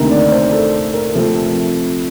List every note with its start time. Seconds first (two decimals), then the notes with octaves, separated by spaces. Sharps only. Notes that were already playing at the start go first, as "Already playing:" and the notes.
Already playing: D2 C3 D#3 A#3 A#4
0.10 D5
0.32 C5
0.51 A4
0.94 A#4
1.13 C3 F3 A3 C4 A4